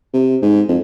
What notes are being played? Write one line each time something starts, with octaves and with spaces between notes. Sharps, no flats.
C3
G#2
F2